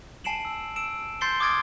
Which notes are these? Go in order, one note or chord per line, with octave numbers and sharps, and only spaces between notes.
G#5 A5 C7 D7 E7 F#7
E6
E6 D7 E7
C6 G6 A6 C7 C#7 G7
D6 D#6 F6 G#6 A6 D7